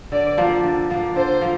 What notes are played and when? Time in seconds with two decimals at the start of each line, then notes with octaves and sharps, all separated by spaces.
0.12 D3 D5
0.37 F3 A#3 D4
0.64 D3
0.90 F3 A#3 D4
1.16 D3 C5
1.41 F3 A#3